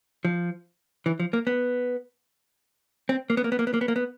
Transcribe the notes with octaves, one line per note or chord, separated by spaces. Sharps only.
F3
E3
F3
A#3
B3
C4
A#3
B3
A#3
B3
A#3
B3
A#3
B3
A#3
B3